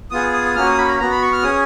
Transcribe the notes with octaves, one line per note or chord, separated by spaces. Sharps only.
B3 F4 G#4 D#6
D#6
D#6
A#3 C#4 F#4 F6
D#6
B5
A#5
B3 F#4 A#5
B5
C#6
F6
C#4 G#4 D#6